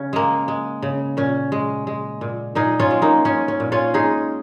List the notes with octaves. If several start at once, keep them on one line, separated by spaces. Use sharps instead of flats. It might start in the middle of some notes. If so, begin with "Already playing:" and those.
Already playing: C#3 C#4
G#3 A#3
G#3
C#3
A#2 C#4
G#3
G#3
A#2
A#2 D#4 G#4
C#4 F4
G#3
A#3 D#4
G#3 C#4
C#4
A#2
C#4 F4
G#3 D#4 G#4